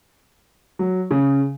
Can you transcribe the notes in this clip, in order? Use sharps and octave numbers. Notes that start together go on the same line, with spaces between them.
F#3
C#3